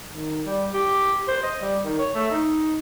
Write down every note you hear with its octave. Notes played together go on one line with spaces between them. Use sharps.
D#3
G3
G4
C5
D#5
G3
D#3
C#5
A3
D#4